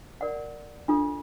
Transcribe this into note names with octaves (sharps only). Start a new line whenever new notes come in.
A#4 D5 F#5
D4 F4 A4